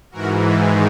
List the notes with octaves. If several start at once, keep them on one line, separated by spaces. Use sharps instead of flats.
G#2 E3 F#4 A#4
G#2 D#3 G#4